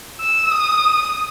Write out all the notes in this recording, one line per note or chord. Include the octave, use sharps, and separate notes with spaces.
E6
D#6